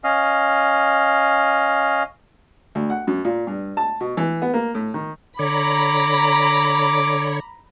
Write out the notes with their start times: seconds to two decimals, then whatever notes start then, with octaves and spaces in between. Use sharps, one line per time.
0.04 C#4 D#5 F5
2.75 D2
2.90 F#5
3.07 F#2
3.25 A#2
3.47 G2
3.77 A5
4.01 B2
4.17 E3
4.42 B3
4.54 A#3
4.75 A2
4.94 D#3
5.39 D3 C#5 A#5 B5 D6